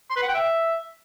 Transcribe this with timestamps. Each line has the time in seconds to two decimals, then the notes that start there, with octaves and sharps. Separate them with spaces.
0.10 C6
0.16 B4
0.22 F#5
0.28 G5
0.35 E5